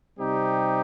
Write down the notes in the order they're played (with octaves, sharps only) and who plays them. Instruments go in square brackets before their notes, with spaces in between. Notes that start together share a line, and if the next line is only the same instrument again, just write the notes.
[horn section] C3 G3 C4 D#4 G4